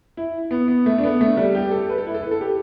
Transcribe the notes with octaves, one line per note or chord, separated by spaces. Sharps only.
E4
B3
B3
A3
D4
B3
A3
G3
G4
A4
B4
A4
E4
A4
B4
A4
G4